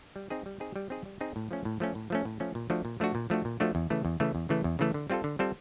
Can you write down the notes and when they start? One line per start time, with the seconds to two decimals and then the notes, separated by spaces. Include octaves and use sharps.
0.16 G3
0.30 C4 D#4 G#4
0.46 G3
0.60 C4 D#4 G#4
0.76 G3
0.90 C4 D#4 G#4
1.06 G3
1.21 C4 D#4 G#4
1.36 A2
1.51 F3 A3 C#4
1.65 A2
1.80 F3 A3 C#4
1.95 A2
2.10 F3 A3 C#4
2.25 A2
2.40 F3 A3 C#4
2.55 A#2
2.70 F3 A3 D4 F#4
2.85 A#2
3.00 F3 A3 D4 F#4
3.15 A#2
3.30 F3 A3 D4 F#4
3.45 A#2
3.60 F3 A3 D4 F#4
3.75 E2
3.90 C#3 E3 A3
4.05 E2
4.20 C#3 E3 A3
4.35 E2
4.49 C#3 E3 A3
4.64 E2
4.79 C#3 E3 A3
4.94 D3
5.10 G3 C4 F4 A4
5.24 D3
5.39 G3 C4 F4 A4